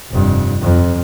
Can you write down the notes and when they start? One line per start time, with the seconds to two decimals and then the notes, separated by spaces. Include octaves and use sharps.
0.10 F1 G2
0.61 F2